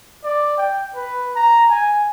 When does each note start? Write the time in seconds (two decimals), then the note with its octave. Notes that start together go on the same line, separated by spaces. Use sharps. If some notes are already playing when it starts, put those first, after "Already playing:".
0.24 D5
0.57 G5
0.95 B4
1.35 A#5
1.69 G#5